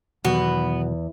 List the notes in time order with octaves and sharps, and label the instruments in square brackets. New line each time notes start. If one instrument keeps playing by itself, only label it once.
[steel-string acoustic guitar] E2 [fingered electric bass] B2 D#3 F#3 [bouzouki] B3 [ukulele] F#4